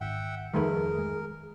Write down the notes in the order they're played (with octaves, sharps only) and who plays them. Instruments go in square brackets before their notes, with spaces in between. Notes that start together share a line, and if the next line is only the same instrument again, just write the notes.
[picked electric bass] G#1 [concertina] E5 F#5 G5
[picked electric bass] F2 F3 G3 [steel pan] D#3 A3 B4 [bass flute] G#4 [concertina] A#4
[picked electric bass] G#3